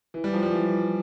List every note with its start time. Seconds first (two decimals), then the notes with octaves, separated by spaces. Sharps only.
0.14 E3
0.24 G3
0.33 F3
0.43 G3
0.52 E3